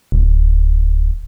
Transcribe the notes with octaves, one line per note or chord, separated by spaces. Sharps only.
D1